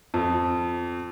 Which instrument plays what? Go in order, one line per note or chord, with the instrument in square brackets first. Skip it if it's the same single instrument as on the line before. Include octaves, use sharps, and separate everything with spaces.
[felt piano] F2